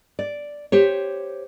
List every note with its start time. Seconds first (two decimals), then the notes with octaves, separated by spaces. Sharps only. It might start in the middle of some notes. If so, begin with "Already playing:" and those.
0.19 D5
0.72 G4 C5 C#5